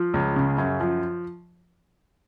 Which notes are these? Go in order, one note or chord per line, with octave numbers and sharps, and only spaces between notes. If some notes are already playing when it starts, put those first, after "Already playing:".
Already playing: F3
C#2
C#3
F#2
F3